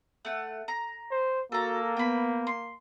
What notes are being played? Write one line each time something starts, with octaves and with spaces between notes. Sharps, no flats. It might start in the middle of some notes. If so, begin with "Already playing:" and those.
A3 F#5
A#5
C5
A#3 F#4 A4 A#5
B3 G5 B5
C6